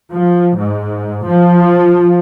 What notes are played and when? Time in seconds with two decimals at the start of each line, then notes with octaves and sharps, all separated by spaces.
0.12 F3
0.57 G#2
1.26 F3